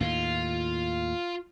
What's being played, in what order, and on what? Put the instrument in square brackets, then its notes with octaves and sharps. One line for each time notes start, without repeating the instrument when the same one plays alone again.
[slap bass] D#2 A2 D#3 [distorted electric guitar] F4